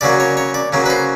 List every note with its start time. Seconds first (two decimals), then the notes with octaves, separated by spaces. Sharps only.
0.01 C#3 F#3 A#3 D5
0.20 C#5
0.37 C#5
0.54 D5
0.73 C#3 F#3 A#3
0.86 B4
0.90 C5